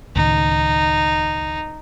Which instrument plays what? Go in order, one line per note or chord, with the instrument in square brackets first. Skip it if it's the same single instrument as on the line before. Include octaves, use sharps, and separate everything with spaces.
[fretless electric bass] C#2 A2 D#3 [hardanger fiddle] D#4